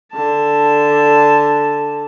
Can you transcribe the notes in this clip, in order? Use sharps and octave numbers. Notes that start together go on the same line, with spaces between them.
D3 A5